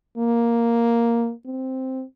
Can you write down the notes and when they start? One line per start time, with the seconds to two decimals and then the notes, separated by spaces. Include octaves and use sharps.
0.17 A#3
1.46 C4